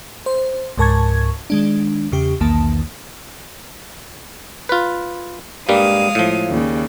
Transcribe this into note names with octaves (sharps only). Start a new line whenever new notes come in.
C5
C#2 G#2 A#4 A5 C#6 G#6
D#3 G#3 D4
E2 C#3 G4
B1 E2 D#3 A#3 A5
F4 B4
G2 G3 G#3 A#3 F5 D#6
A2 F3
D#2 C#3 G3